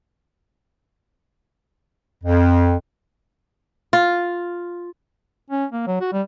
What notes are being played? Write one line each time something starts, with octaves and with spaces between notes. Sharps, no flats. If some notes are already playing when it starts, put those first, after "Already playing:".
F2
F4
C#4
A#3
F#3
F#4
G3